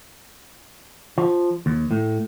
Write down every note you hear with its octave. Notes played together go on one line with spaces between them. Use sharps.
F3
D#2
A2